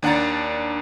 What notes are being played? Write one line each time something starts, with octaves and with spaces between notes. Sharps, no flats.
D#2 D4 F#5 A#5 A6